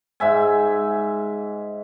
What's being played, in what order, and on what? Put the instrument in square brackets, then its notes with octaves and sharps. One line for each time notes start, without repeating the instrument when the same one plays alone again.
[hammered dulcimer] G#2 E5 G#5